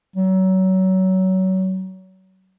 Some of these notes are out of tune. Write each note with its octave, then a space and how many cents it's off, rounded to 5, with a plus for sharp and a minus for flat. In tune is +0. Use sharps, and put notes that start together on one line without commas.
F#3 +25